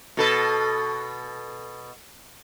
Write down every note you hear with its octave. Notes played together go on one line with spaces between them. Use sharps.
B2 A4 B4